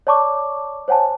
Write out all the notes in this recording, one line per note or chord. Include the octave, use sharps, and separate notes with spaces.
C#5 D5 A5 C#6 D6
C5 C#5 F#5 G#5 A5